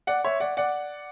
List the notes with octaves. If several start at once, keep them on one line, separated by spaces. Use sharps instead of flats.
D5 F#5
C#5 E5
D5 F#5
D5 F#5